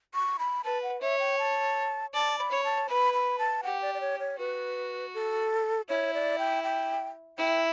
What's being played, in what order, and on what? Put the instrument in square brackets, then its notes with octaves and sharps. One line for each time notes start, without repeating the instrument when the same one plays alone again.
[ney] C#6
B5
[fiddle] B4 [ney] A5
[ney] F#5
[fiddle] C#5 [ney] E5
[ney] G5
A5
[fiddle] D5 [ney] A5
[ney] B5
[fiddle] C#5
[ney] A5
[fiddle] B4 [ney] B5
[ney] B5
A5
[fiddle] G4 [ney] F#5
[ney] D5
D5
C#5
C#5
[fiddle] F#4 [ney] B4
[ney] A4
[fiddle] E4 [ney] C#5
[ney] D5
G5
G5
[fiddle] E4 [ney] G5